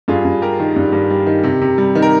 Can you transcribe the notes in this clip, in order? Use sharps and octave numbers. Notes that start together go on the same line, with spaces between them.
G2 F4 G#4
G2
G3 G4 A#4
D#3
G2
G2
G3
D#3
C3
C3
G3
D#3
A#4